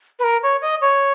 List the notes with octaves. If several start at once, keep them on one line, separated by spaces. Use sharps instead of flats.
B4
A#4
C#5
D#5
C#5